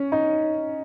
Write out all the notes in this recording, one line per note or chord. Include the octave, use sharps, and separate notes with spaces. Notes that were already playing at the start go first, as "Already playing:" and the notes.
Already playing: C#4
D#4